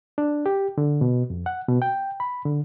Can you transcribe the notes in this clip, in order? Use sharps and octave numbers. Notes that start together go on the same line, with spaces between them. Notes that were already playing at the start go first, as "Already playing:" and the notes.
D4
G4
D3
B2
F2
F#5
B2
G5
B5
D3